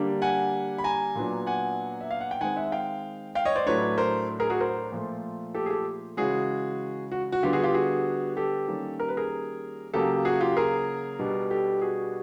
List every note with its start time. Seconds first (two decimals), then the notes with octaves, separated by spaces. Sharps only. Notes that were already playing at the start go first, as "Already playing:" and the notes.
Already playing: D3 G3 A#3 D4
0.22 F#5 G#5
0.78 B5
0.84 G#5 A#5
1.15 A#2 F#3 B3 D4
1.47 F#5 G#5
2.01 E5
2.11 F5
2.21 F#5
2.31 G5
2.41 D#3 G#3 C4 F#5 G#5
2.56 E5 F#5
2.72 F5 G5
3.35 F5 G5
3.45 C#5 D#5
3.56 C5 D5
3.66 A2 F#3 A3 D4 B4 C#5
3.98 A#4 C5
4.40 G#4 A#4
4.50 F#4 G#4
4.61 A#4 C5
4.92 A#2 F3 A3
5.54 G4 A4
5.66 G#4
5.70 G4 A4
6.17 C#3 E3 G#3 C#4 F#4 G#4
7.11 F#4
7.32 F#4
7.43 D3 G3 B3 D4 F4 G4
7.53 F#4 G#4
7.64 F4 G4
7.74 F#4 G#4
8.37 G4 A4
8.68 D#3 G3 A#3 C#4
9.00 A#4
9.08 B4
9.17 G#4 A#4
9.94 C#3 F#3 A#3 G4 A4
10.25 F#4 G#4
10.41 F4 G4
10.56 G#4 A#4
11.19 B2 G3 B3 D4
11.51 G4 A4
11.82 F#4 G#4